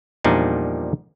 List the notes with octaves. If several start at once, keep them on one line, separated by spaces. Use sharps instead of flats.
E2 A#2 F3 G3 D4 D#4